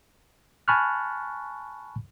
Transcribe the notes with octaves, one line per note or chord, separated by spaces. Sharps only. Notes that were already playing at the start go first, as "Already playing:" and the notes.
G#5 A5 B5 C#6 F6 F#6